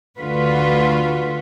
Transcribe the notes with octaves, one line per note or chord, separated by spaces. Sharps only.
D2 D3 F4 F#4 B4